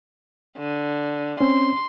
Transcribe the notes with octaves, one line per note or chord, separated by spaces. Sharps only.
D3
C4 C#4 C6